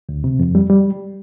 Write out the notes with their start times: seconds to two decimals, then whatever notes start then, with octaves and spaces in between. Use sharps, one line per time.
0.09 D2
0.24 C3
0.40 F2
0.55 G3
0.70 G3